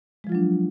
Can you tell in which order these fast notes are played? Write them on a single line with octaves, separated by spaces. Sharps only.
G#3 F3 F4 F#3 D4